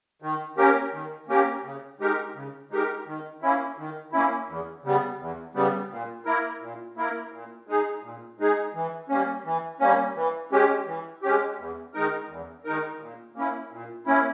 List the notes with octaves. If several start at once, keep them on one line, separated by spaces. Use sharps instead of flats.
D#3
A#3 C#4 G4 A#4
D#3
A#3 C#4 G4 A#4
C#3
G#3 D#4 G4 A#4
C#3
G#3 D#4 G4 A#4
D#3
A#3 C#4 E4
D#3
A#3 C#4 E4
E2
C#3 G3 B3
E2
C#3 G3 B3
A#2
A#3 E4 A#4
A#2
A#3 E4 A#4
A#2
G#3 D#4 G#4
A#2
G#3 D#4 G#4
E3
G3 A#3 C#4
E3
G3 A#3 C#4
E3
G#3 C#4 G4
E3
G#3 C#4 G4
E2
D#3 G#3 D#4 A#4
E2
D#3 G#3 D#4 A#4
A#2
A#3 C#4 E4
A#2
A#3 C#4 E4